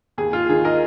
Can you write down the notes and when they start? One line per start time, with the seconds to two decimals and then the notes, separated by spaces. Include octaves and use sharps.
0.18 D#2 G#4
0.33 F4
0.49 D#3 G#4
0.65 A#4 D#5